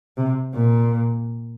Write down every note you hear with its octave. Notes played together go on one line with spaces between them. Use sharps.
C3
A#2